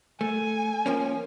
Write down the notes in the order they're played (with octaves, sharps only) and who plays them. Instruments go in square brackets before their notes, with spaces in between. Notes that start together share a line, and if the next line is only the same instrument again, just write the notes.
[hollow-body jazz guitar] A3 [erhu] G#5
[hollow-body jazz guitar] F3 A#3 C#4